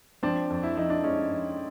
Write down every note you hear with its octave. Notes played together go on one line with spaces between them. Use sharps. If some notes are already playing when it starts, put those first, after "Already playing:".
F3 C4 D4
F2
E4
F2 D#4
D4
G#3 C#4 D#4
F2